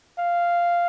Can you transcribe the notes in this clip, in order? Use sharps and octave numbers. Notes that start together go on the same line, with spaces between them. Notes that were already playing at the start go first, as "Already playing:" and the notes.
F5